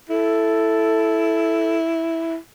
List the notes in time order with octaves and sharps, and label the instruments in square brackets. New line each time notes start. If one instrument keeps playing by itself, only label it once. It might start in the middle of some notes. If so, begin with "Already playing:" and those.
[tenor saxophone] E4 [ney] A4